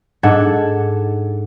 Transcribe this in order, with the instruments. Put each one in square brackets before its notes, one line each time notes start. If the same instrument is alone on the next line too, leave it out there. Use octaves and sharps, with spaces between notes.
[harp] G#2 D4 A4 F#5 G#6